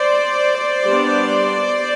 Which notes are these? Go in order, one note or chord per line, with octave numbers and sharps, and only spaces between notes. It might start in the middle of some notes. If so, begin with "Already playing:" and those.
Already playing: C5 D5
G3 B3 D4